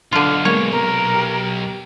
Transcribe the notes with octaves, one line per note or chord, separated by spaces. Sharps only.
B1 D3 F4
G#3 A#3 B3 C#5
C3 A#4
G4